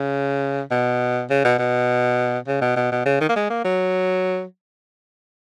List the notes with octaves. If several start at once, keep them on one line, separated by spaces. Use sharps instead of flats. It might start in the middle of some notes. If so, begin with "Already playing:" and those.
Already playing: C#3
B2
C#3
B2
B2
C#3
B2
B2
B2
C#3
D#3
A#3
G#3
A#3
F#3